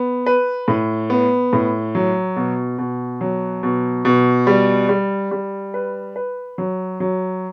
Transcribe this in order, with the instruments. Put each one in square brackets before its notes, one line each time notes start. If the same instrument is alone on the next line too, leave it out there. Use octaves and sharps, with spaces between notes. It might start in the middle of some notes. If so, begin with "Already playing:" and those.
Already playing: [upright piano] B3
B4
A2
B3
A2
F#3
B2
B2
F#3
B2
B2
G3
G3
G3
B4
B4
F#3
F#3